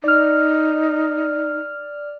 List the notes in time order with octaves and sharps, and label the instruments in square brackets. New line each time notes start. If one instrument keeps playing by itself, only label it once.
[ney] D#4 [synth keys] D5 F6